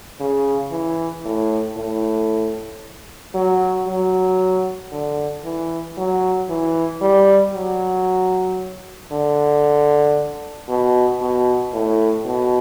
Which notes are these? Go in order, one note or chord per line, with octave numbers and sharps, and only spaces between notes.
C#3
E3
A2
A2
F#3
F#3
D3
E3
F#3
E3
G3
F#3
D3
B2
B2
A2
B2